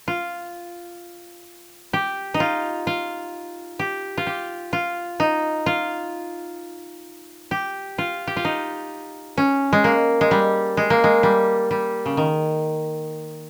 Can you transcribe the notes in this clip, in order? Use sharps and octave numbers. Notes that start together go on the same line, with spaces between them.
F4
G4
D#4
F4
F4
G4
F4
G4
F4
D#4
F4
G4
F4
G4
F4
D#4
C#4
G#3
A#3
G#3
G3
G#3
A#3
G#3
G3
G3
C#3
D#3